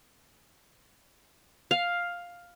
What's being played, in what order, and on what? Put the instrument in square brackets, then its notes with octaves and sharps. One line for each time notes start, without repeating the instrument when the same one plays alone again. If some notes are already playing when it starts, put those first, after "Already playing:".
[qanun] F5